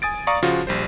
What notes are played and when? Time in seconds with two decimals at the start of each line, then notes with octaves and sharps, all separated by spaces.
0.02 G#5 D#6 A6 D7
0.27 D5 F5 A#5 C#6 D#6
0.42 C#3 F3 F4 F#4
0.67 A#1 G3 C5